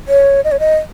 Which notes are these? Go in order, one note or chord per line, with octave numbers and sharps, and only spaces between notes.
C#5
D#5
C#5
D#5